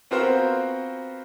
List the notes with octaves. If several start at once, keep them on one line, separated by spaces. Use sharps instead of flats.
B3 C4 F4 F#4 A#4 C5